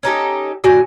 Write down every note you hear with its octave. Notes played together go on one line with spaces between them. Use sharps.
C#4 D#4 G4 A4
A2 D3 F#4 G#5